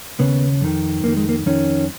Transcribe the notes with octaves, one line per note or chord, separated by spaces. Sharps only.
D#2 C#3 B3
F2 D#3
F2 D#3 A#3
G#3
A#3
F2 D#3 C#4